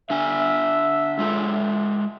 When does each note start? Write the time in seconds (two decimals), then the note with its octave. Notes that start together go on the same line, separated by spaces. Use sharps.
0.10 D3 D4 E5 G#5
1.19 G#3 F4 A4